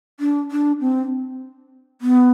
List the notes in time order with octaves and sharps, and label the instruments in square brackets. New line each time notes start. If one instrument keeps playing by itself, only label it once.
[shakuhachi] D4
D4
C4
B3